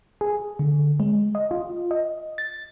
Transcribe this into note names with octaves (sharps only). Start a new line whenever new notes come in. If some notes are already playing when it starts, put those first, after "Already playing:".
G#4
D3
G#3
D#5
F4
D#5
A6